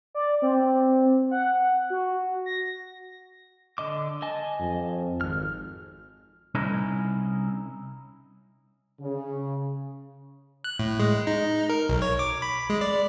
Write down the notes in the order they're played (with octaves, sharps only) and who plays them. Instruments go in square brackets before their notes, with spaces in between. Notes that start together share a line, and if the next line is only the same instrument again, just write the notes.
[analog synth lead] D5
C4
F#5
F#4
A#6
[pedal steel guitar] D3 D#5 D6
D#5 G#5 A5
[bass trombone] F2
[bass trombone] G#1 [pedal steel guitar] F6
[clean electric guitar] C2 C#4 D#4 E4
[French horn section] C#3
[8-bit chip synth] F#6
A2
G#3
D#4
A#4
B1
C#5
D6
B5
G#3
D5